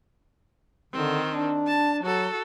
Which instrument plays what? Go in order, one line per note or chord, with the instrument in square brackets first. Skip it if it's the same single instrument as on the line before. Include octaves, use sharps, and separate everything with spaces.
[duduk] D3 [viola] D#3 C4
[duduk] D4
[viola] A5
[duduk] F#3 [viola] F#4 A4